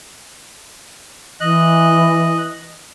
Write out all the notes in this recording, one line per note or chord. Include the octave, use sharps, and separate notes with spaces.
E3 D#5 F#6